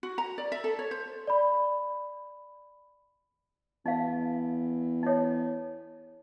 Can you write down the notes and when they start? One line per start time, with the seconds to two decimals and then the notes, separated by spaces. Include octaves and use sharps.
0.03 F#4
0.18 A#5
0.38 D5
0.52 E5
0.64 A4
0.79 C#5
0.91 C5
1.27 D5 B5
3.86 E2 D#4 F5
5.03 D#4 C#5